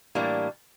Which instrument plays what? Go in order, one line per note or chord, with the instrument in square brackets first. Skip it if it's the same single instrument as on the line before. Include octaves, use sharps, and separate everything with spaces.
[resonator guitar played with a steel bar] A2 E3 G3 A#3 D4